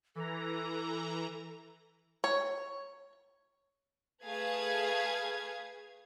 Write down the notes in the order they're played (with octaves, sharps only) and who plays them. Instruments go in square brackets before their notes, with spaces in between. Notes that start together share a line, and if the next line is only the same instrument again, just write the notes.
[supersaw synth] E3 A#5 [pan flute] A4
[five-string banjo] C#5
[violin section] A3 G#4 B4 F5 D#6 G#6